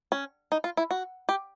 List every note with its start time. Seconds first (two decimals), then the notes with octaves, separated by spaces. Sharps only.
0.12 C#4
0.52 D#4
0.64 F4
0.77 E4
0.91 F#4
1.29 G4